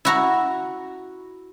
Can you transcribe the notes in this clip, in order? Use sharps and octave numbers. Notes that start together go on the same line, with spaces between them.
E4 F#4 A#5